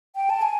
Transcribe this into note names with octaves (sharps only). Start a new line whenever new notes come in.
G5
A5
G#5